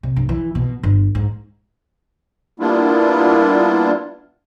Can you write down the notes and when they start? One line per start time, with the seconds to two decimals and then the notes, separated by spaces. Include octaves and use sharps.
0.03 C3
0.16 G2
0.29 E3
0.55 B2
0.83 G1
1.15 G#2
2.60 G3 A#3 B3 D4 E4 F4